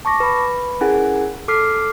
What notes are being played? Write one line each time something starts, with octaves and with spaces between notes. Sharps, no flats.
A5 C#6 D6 A#6
B4 B5
C#4 E4 G#4 A#4 F#5 G#5
A4 D6 F6 B6 C7